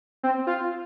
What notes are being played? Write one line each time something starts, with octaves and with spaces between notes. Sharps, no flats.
C4
F4